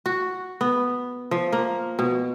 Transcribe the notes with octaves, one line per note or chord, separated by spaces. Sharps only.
F#4
B3
F3
A#3
B2